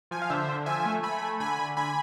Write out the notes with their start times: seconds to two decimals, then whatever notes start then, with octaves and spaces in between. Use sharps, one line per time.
0.11 F3 G#5
0.22 F5
0.30 D3 C5 E5
0.48 D3
0.66 F3 E5 G#5
0.85 A3
1.03 A3 G#5 B5
1.22 A3
1.40 D3 G#5 B5
1.59 D3
1.77 D3 G#5 B5